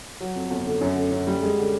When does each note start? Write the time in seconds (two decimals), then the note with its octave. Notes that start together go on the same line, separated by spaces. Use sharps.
0.21 F#3
0.36 F2
0.51 G1
0.66 D3
0.81 F#2
0.96 D3
1.12 F#2
1.27 G3
1.42 G#3
1.58 D3